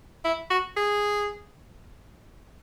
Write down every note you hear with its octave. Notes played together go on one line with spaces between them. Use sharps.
E4
F#4
G#4